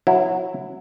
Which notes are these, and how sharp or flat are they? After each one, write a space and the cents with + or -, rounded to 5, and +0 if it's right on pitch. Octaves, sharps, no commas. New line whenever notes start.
F#3 -15 E4 +0